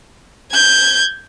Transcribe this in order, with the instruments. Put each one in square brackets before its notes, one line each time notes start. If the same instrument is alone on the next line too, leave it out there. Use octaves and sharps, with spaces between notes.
[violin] G6 G#6